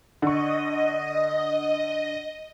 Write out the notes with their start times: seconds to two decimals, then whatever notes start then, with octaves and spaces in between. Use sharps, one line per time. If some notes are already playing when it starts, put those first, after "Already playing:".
0.22 D3 D#5 C#6